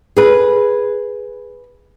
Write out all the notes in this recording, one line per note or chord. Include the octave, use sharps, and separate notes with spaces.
G#4 B4